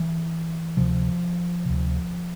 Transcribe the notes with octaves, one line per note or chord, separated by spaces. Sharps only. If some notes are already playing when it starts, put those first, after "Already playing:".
Already playing: E3
D2 C3 F3
D2 C3